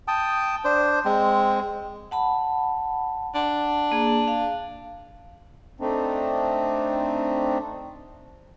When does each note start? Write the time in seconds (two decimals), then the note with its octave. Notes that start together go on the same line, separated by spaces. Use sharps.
0.08 G5 A5 D#6
0.65 D4 C5
1.05 G#3 C4
2.11 F#5 A5 B5
3.35 D4 F#5
3.92 A#3 G#4
4.28 F5
5.80 A3 C4 D4 D#4